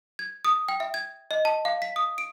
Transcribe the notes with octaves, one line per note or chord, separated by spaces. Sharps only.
G#6
D#6
G5
E5
G#6
D#5
A5
F5
B6
D#6
D7